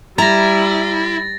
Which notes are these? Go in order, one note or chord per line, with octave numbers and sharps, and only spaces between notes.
G3 E4 A#5 A6 A#6